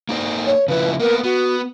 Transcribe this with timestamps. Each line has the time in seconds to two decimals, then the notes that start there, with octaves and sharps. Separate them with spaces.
0.09 A#3 D#4 C5
0.45 C#5
0.68 C#3 F3 E4 B4
1.00 A#3 B3 A#4
1.24 B3 F#4